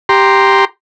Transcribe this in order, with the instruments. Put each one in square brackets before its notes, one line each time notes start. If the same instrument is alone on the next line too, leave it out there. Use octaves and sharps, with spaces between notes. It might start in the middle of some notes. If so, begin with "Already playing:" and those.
[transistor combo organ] G4 A#5 C6